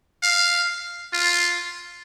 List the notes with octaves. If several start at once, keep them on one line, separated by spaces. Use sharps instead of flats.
F5
F4